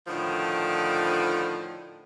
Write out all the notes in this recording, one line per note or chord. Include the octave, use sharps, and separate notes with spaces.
A2 D3 D#3 F3